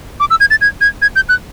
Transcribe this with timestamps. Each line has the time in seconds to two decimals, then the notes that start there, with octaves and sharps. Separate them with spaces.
0.20 D6
0.30 E6
0.40 G#6
0.51 A6
0.61 G#6
0.81 G#6
1.02 G#6
1.16 G6
1.29 F#6